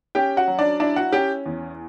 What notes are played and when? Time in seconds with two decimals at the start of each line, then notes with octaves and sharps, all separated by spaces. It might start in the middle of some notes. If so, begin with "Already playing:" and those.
0.15 C#4 G4 G5
0.37 F#4 F#5
0.48 F#3
0.59 D4 D5
0.80 D4 E4 D5
0.96 F#4 F#5
1.13 C#4 G4 G5
1.46 E2